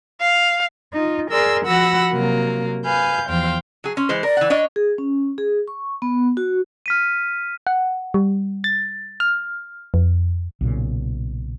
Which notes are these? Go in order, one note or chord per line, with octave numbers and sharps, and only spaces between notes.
F5
D#4 F4
G#4 A#4 D5 C6 E6
F3 F#4 F#5 B5 E6 A#6
C3 F#3 A#3
B4 F5 G#5 G6
E2 F3 C5 F5 G5
F#3 G#4
C#4 C6
E3 G#3 C5
A#4 D5
E3 F#5
D4 C#5 D#5
G#4
C#4
G#4
C#6
B3
F#4
F6 B6 D#7
F#5
G3
A6
F6
F2
B1 A#2 C#3